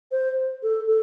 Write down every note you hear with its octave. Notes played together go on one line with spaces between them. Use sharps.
C5
A4
A4